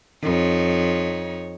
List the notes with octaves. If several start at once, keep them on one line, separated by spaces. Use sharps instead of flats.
F2 D#4 C#5